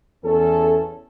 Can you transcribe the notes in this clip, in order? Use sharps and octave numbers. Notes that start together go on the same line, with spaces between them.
E2 C#4 A4